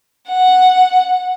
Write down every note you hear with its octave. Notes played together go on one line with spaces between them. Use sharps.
F#5